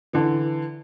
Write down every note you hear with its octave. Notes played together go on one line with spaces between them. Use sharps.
D3 E3